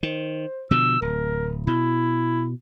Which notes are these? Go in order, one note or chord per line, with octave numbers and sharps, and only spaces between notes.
D#3 C5
B2 D3 F3 E6
D1 A#4
B2 E4